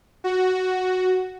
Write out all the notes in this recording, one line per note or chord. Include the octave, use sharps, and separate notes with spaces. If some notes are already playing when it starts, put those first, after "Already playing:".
F#4